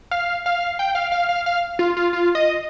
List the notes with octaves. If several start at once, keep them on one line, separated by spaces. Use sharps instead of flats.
F5
F5
G5
F5
F5
F5
F5
F4
F4
F4
D#5